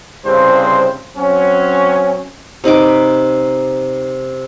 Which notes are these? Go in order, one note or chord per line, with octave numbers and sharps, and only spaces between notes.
C2 G2 C#3 C4 C5
F#3 C4 C#4
C3 D#4 B4 D6